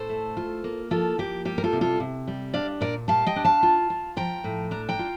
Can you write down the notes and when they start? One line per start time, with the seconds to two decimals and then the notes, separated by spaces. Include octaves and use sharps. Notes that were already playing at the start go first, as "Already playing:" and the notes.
Already playing: A2 A4 C5
0.09 A3
0.37 F4
0.64 A#3
0.91 F3 F4 A4
1.18 A#3 G4
1.45 G3 G4
1.58 A#4
1.64 F4 A4
1.73 C3
1.81 F4 A4
2.00 C3
2.28 G3
2.54 D4 D5 F5
2.81 A#2 A#4 D5
3.08 G3 F5 A5
3.26 D#5 G5
3.36 D4
3.45 F5 A5
3.63 F4
3.90 F4
4.17 F3 G5 A#5
4.44 A2
4.71 D4 A#5
4.89 G5 A#5
4.99 F4